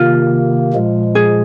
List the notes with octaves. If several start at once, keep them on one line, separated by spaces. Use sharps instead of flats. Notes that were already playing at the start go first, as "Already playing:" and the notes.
Already playing: C3 D#3 A#3 F4
A#2 F3 G#3
G#4